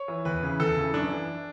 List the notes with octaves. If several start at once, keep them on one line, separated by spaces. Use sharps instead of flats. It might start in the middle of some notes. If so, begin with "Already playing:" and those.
Already playing: C#5
E3
E2 B4
C#3 E3
E2 A4
C#3 E3
F#2 D4
E3